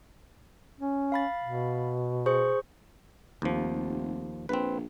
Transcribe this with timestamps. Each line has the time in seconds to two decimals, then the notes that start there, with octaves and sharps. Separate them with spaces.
0.80 C#4
1.12 F5 B5 A6
1.44 B2
2.26 G#4 C5 C#6
3.42 F1 D#2 F3
4.49 A#1 C4 B4